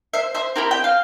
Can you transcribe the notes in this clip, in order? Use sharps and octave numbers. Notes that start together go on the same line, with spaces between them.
C5 E5
C5 E5
C4 E4 G4 A#4
G5
F5